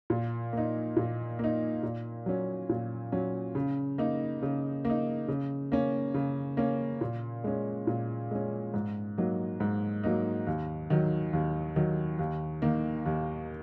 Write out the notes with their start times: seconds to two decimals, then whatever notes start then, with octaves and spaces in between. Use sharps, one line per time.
0.10 A#2
0.53 A#3 D#4
0.97 A#2
1.39 A#3 D#4
1.83 A#2
2.26 F#3 C#4
2.69 A#2
3.12 F#3 C#4
3.55 C#3
3.98 A#3 D#4
4.42 C#3
4.85 A#3 D#4
5.28 C#3
5.72 A#3 C#4
6.14 C#3
6.57 A#3 C#4
7.01 A#2
7.44 G#3 C#4
7.87 A#2
8.31 G#3 C#4
8.74 G#2
9.17 F#3 A#3 D#4
9.60 G#2
10.03 F#3 A#3 D#4
10.47 D#2
10.90 D#3 F#3
11.33 D#2
11.76 D#3 F#3
12.19 D#2
12.62 D#3 A#3
13.06 D#2